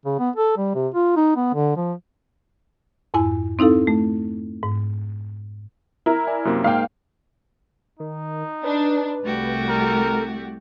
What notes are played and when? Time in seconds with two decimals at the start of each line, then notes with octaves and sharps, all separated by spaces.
0.05 C#3
0.19 B3
0.36 A4
0.57 G3
0.75 C3
0.94 F4
1.16 D#4
1.36 B3
1.54 D3
1.77 F3
3.14 F2 G#2 E4 G#5
3.59 C4 D#4 E4 A4 F5
3.87 A3
4.63 G#2
6.06 E4 A#4
6.27 D5 G#5
6.45 F#2 C3 A#3
6.64 G#2 A#3 F5 G5
8.00 D#3 D#4
8.64 D4 B4
9.22 C2 A3 F#4 G4
9.69 A4 A#4